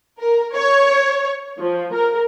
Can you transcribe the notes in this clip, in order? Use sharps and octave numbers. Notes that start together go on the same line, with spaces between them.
A#4
C#5
F3
A#4